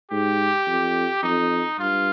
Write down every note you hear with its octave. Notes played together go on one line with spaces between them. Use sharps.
G#2 G4
F2
F2 D#4
G2 F4